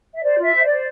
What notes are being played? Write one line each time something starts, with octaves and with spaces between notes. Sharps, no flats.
E5
C5 D5
F4
E5
C5
D5
C5